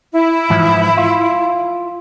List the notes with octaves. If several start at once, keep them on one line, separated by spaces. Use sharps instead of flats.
E4
G#2 E3 F3
F4